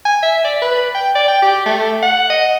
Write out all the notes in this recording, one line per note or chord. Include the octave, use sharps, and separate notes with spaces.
G#5
E5
D5
B4
G5
D5
G5
G4
A3
F#5
D#5